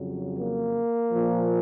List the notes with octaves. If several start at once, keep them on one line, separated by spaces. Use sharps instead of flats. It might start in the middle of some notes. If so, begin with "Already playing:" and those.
Already playing: F2 C#3 F#3
A#3
A#2 F3